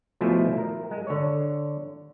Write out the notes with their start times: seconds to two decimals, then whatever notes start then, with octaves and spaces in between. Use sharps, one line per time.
0.21 B2 F3 A3 E4 C5 G#5
0.58 A#4
0.91 G#3
1.07 D3 C#5